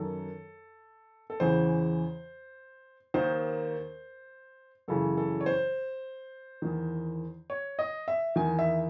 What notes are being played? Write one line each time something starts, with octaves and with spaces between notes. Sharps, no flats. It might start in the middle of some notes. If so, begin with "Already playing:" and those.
Already playing: F#2 D#3 A4
A4
E2 C#3 E3 C5
D#2 D#3 C5
F#2 C#3 E3 A4
A4
C#5
C5
E2 D#3
C#5
D#5
E5
E2 D#3 G#5
E5